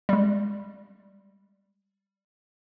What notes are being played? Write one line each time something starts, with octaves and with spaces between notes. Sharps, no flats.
G3 G#3